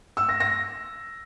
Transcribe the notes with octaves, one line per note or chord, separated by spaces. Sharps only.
E6
A#6
A#6